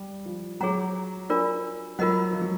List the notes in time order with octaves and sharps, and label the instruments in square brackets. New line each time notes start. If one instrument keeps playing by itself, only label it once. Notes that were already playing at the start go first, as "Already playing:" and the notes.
Already playing: [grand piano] G3
F3
[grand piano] F#3 [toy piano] G#4 C#5 F#5 A#5
[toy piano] D4 F4 A#4 D5
[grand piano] F#3 [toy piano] F4 A#4 D#5 F#5
[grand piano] F3
F#3